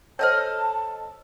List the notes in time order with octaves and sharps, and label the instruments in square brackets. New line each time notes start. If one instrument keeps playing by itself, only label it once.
[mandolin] A4 D#5 F6 [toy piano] C5 C#5 [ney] A5